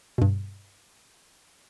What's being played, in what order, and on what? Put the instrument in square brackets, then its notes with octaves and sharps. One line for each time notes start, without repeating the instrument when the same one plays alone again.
[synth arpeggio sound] G2 B2